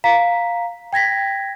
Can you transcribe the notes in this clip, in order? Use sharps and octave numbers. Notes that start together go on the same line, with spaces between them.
F5 A#5 B6
G5 G#6 A#6 B6